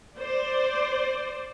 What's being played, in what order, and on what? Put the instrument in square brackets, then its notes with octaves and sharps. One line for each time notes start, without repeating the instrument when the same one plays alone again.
[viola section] C5 D5